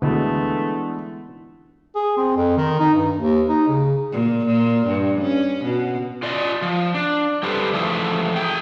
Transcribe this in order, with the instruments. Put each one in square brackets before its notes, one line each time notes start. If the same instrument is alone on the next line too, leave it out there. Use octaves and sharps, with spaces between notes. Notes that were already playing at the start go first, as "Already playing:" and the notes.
[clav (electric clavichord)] D2 B2 [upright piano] D3 [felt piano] E3 G#3 B3 [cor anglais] A3
[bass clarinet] G#4
C4
F2
D#3
D#4
G2
D#2
D#4
C#3
[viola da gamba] A#2
A#2
G2
C#4
B2
[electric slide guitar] F4 D5 D#5
F3
D4
G3 G4 A4 B4 C5
E3 F3 A3 G#4 E5
G#4 G5